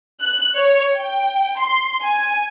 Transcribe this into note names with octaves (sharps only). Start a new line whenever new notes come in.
F#6
C#5
G5
C6
G#5